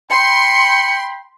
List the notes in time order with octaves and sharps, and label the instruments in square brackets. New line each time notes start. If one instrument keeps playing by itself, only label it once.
[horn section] G5 B5 [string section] C6 [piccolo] C#7